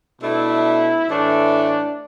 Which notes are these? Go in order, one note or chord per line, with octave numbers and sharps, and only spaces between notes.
B2 A3 D4 E4
A2 E3 A3 D4